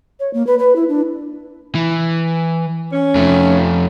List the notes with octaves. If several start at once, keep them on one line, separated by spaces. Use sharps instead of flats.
C#5
A#3
B4
B4
E4
D4
E3
C#4
F2 A3